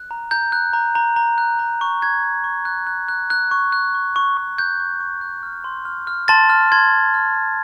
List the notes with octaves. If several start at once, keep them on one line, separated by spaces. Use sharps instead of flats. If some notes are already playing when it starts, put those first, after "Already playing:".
Already playing: F#6
A#5
A#5 G6
F#6
A#5
A#5
A#5
F#6
A#5
C#6
F#6 G#6
C#6
C#6
F#6
F#6
F#6
F#6
C#6
F#6
C#6
C#6
C#6
F#6 G6
C#6
C#6
F#6
F6
C6
F6
F6
A5 C6 A6
F6
C6 G#6
C6
F6
C6